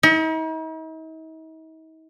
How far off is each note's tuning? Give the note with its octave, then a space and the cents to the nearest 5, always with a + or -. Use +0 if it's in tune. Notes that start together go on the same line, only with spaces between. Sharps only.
D#4 +45